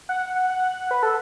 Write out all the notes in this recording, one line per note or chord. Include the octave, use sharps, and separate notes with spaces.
F#5
F#5
B4
A4